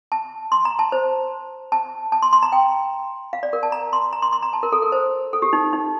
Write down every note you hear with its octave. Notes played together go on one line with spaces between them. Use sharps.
A5
C6
A#5
A5
C5
A5
A5
C6
C6
A#5
G5
F5
D5
A#4
A5
A#5
C6
A#5
C6
C6
A#5
A5
A#4
A4
A#4
C5
A4
G4
D#4
D#4